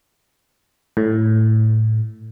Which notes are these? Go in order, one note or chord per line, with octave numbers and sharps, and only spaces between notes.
A2